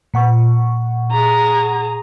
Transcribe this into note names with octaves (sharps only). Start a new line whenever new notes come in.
A#2 F#5 C#6
G#4 A#5